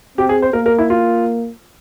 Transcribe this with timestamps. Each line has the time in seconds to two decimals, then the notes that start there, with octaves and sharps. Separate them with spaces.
0.18 C4 G4
0.29 G#4
0.42 C5
0.53 A#3 A#4
0.66 A#4
0.78 E4
0.90 F4